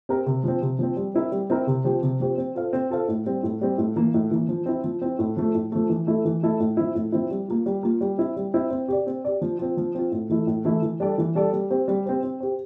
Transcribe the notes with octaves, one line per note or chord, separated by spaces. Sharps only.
C4 G4 A#4
C3
F3 C4
C3
F3 C4
G3
C4 E4 A#4
G3
C4 E4 A#4
C3
F3 C4 G4 C5
C3
F3 C4 G4 C5
C4
F4 A4 C5 F5
C4
F4 A4 C5 F5
A2
G3 C4
A2
G3 C4
A2
E3 A#3
A2
E3 A#3
F3
C4 E4
F3
C4 E4
A2
F3 A3
A2
F3 A3
E3
A3 E4 A4
E3
A3 E4 A4
A2
F3 C4 E4
A2
F3 C4 E4
G3
A#3 F4
G3
A#3 F4
G3
C4 E4
G3
C4 E4
C4
G4 D5
C4
G4 D5
F3
C4 F4
F3
C4 F4
A2
E3 A3 E4
A2
E3 A3 E4
E3
G3 D4 A4 D5
E3
G3 D4 A4 D5
G3
C4 G4 C5
G3
C4 G4 C5
C4
G4 C5